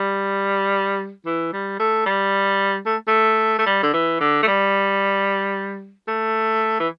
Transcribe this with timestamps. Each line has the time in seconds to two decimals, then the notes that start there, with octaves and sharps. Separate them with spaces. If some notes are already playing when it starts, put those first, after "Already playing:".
Already playing: G3
1.26 E3
1.53 G3
1.79 A3
2.06 G3
2.86 A3
3.07 A3
3.58 A3
3.66 G3
3.83 D3
3.93 E3
4.20 D3
4.43 A3
4.47 G3
6.08 A3
6.80 E3